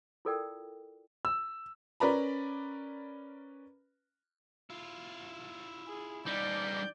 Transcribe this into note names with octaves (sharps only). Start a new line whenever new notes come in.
E4 F4 A4 A#4 D5 G5
E6
C#4 A#4 B4 D5 A#5 B5
E4 F4
G#4
G3 D#4 D5 G6